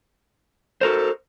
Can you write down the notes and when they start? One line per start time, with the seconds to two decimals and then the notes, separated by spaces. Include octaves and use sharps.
0.81 F#4 A4 A#4 C5